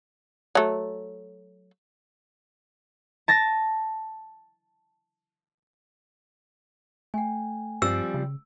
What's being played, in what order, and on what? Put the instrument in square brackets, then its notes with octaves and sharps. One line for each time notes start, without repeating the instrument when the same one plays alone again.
[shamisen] F#3 A3
[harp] A5 A6 A#6
[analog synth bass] A3 [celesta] G5 G#5
[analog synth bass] G2 [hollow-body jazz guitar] F3 G3 C4 [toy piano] E6
[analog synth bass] C#3